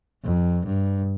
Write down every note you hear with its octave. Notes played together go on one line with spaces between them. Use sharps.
F2
G2